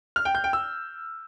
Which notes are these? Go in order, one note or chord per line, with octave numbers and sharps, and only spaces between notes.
F6
G5
G6
G5
E6